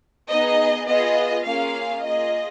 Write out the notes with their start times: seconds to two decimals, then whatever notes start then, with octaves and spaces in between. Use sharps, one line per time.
0.30 B3 D#4 G#4 D#5
0.87 B3 F4 G#4 D#5
1.45 A#3 C#4 F4 G#4 F5
2.03 A#3 F4 G#4 D#5